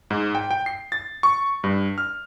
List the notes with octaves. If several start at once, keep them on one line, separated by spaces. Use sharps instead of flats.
G#2
G5
G5
C7
A6
C#6
G2
F6